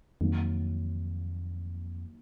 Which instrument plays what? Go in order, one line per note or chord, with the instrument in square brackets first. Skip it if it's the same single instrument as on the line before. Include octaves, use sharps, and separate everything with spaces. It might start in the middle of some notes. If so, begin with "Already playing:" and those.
[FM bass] F2 [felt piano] D#3 F#3 A#3